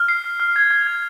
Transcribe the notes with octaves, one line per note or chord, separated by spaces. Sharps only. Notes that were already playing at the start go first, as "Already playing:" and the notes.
Already playing: F6
C7
C7
F6
G#6
G#6
G#6